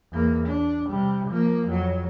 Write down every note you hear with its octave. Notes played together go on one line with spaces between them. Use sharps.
E2 A#3
D4
C3 G3
F3 A#3
F2 F#3